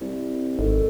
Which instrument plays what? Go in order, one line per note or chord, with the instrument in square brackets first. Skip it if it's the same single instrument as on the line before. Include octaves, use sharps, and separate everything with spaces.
[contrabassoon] C2
[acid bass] G#1 [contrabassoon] D#3 [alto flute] A4